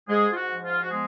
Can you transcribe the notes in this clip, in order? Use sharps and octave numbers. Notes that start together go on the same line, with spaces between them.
G#2 G#3 G#4
F4
F#4
F3
F4
F#4
G#3 B3 G#4